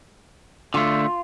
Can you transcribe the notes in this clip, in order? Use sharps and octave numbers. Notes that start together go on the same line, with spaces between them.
D3 A3 F4